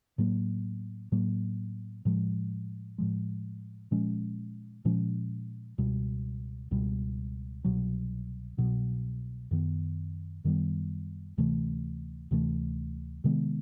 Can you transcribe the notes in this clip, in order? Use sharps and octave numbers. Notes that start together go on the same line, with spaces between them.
A2 F#3 A#3
A2 F#3 A#3
A2 F3 G#3
A2 F3 G#3
A#2 F3 G#3 C#4
A#2 F3 G#3 C#4
C#2 B2 G3
C#2 B2 G3
C2 B2 F#3
C2 B2 F#3
F#2 D#3 G3 B3
F#2 D#3 G3 B3
D2 C3 E3 A3
D2 C3 E3 A3
C3 D#3 G#3 B3